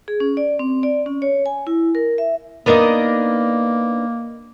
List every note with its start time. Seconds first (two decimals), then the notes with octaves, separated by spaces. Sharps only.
0.08 G#4
0.20 C#4
0.37 D5
0.59 C4
0.83 D5
1.06 C#4
1.22 C#5
1.46 G#5
1.67 E4
1.95 A#4
2.18 E5
2.66 A#3 B3 D4 D#4 A#4 D#5